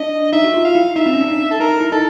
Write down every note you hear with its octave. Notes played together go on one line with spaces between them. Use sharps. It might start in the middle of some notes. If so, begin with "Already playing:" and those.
Already playing: D4 D#5
D#4 E5
F#4
F4
F5
E4
D#4 E5
C4
C#4
D4
D#4
A4
D#4 A#4
E4
D#4 A4